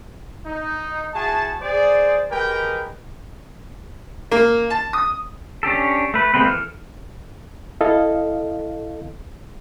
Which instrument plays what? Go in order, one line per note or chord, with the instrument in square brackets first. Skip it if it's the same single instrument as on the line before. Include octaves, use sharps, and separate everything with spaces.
[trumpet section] D#4
E4 F#4 G#4 A5
G#4 C5 D5
G#3 G4 A#4 B4 G5
[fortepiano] A#3
A5
D#6
[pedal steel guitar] C#4 D4 G4 A4
A3 B4
G#3 A#3 C4 B4
E3 A4 F6
[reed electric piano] E4 A4 D#5 F5